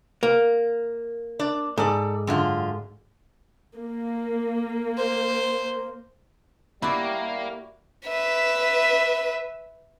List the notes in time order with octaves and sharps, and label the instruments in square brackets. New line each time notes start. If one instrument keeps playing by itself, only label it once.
[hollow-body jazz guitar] A#3
[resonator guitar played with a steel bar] D4 D5
[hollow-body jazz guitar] G#2 [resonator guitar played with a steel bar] A4 D5
[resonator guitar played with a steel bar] F#2 D3 F4
[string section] A#3
[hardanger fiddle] C5
[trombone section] G3 [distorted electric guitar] A#3 [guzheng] E4 F#4 D5 [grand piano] B5
[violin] B4 E5